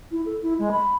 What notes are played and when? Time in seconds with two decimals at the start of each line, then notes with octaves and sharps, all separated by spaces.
0.11 E4
0.26 A4
0.42 E4
0.59 G#3
0.72 B5